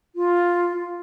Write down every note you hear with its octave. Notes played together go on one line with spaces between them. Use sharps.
F4